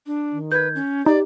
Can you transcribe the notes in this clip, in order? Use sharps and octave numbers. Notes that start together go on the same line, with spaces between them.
D4
D#3
B4 G6 G#6
C#4
D#4 G4 D5